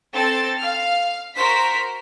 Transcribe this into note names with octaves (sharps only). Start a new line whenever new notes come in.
C4 A4 A6
F5 F6
F#4 A#4 C5 B6